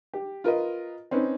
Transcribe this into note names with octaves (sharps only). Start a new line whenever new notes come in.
G4
F4 A#4 B4 D#5
C4 C#4 D#4 B4